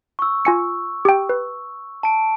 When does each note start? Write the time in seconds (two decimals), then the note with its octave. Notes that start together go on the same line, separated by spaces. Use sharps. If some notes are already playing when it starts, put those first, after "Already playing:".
0.19 C#6 E6
0.45 F4 G#5 C#7
1.05 G4 G5
1.29 B4
2.03 A5 D7